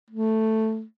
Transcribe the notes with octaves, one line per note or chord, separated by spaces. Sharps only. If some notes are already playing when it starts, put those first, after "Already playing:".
A3